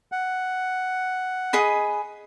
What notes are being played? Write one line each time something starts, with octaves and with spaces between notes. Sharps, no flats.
F#5
G#4 D#5 B5